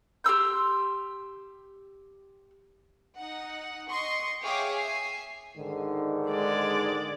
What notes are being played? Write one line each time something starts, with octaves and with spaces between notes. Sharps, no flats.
G4 C6 E6 G6
D#4 F#5
D#5 C6 C#6
G#4 C#5 E5 F5 G5 D6
E5 G#5 C7
G#2 D3 D#3
G#3 D5